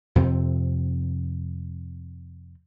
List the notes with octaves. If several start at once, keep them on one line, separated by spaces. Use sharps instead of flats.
F2 C3 C4